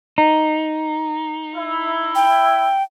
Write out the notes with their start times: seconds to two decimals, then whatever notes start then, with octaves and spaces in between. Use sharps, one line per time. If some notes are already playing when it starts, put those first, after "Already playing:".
0.18 D#4
1.55 E4
2.15 G5